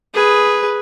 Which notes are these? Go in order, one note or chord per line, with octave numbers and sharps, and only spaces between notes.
G#4 B4